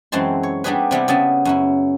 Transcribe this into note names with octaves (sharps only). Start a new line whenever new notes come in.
F#2 E3 G#3 C4 A5 C6
C#5
G3 B3 D4 G4 G#4 B4
C3 G3 B3 E4
C#3 B3 E5 A5
F#2 C#4 E4